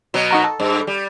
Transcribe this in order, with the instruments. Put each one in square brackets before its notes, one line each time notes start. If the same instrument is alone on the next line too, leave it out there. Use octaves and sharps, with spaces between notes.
[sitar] B2 F#3
[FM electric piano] D#4 F#4 A#4
A4
[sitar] G2
G3